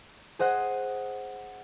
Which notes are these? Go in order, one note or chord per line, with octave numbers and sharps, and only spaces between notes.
G#4 C5 D#5 F#5